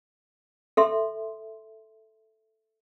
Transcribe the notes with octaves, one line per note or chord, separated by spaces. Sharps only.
A4 E5 C6